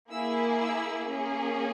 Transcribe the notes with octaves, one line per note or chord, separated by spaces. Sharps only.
A#3 E4 G#4 E6
E6
A#3 C#4 G#4